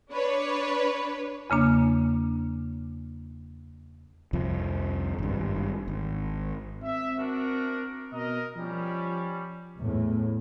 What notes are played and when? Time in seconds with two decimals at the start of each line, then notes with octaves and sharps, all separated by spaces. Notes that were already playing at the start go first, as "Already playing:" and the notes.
0.11 D4 B4 C#5
1.50 E2 C#3 A#3 D4
4.33 C2 F2 F3
5.18 G#1 G2
5.88 G#1
6.83 C4 E5
7.18 D4 F#4 A#4
8.12 B2 A#4 D#5
8.57 F3 G3 C#4
9.80 E2 A2